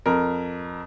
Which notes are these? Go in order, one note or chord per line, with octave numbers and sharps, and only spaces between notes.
F2 A#4